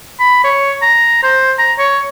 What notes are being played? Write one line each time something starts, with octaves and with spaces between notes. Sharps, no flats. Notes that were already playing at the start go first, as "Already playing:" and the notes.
B5
C#5
A#5
C5
A#5
C#5